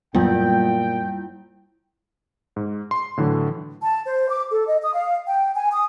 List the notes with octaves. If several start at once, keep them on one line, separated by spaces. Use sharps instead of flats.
F#2 A#2 F#3 G3 B3 E4 F4 G5
G#2
C6
A2 D3 E3 F#3
A5
C5
D6
A4
D#5
D#6
F5
G5
G#5
D#6